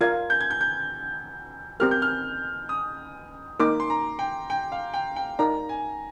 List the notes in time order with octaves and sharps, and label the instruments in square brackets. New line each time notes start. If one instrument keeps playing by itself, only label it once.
[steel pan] F4 A#4 D5 F5 [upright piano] G#6
[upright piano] G6
G#6
G6
G6
[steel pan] C4 G4 A#4 [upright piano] F6
[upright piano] G6
F6
D#6
[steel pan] A#3 D#4 A#4 [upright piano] D6
[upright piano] C6
A#5
G5
G5
F5
G5
G5
[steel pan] D#4 A#4 D5 [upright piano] A#5
[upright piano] G#5